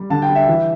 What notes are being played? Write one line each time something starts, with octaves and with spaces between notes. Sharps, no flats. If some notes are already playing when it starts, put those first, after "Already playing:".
Already playing: G3
D3 A5
G5
G3
E5
E3